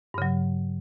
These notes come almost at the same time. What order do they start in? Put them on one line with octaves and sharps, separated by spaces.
G2 C#3 F#3